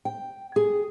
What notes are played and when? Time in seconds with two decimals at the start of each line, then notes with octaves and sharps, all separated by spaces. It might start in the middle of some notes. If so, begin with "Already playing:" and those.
0.05 G5
0.56 G#4